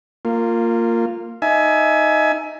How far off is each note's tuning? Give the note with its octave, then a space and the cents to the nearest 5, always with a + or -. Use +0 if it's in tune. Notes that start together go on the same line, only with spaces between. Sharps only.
A#3 -15 F4 +5
D#4 +0 E5 +0 G#5 +25